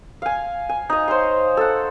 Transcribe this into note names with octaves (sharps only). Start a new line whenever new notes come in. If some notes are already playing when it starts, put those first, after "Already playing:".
F5 G#5
G#5
D#4 D#5
C5 C#5 F5 C6
A4 F#5